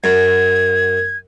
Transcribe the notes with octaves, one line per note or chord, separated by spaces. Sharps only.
F#2 G#6